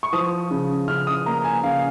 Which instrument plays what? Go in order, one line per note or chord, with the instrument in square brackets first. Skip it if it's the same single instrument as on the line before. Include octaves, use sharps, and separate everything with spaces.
[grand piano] C#6
F3 D#6
C#3
C#3 F6
D#6
A#3 A#5
G#5
C#3 F5